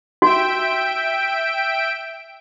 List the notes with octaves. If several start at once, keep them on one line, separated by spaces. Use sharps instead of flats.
F#4 E5 G5 D7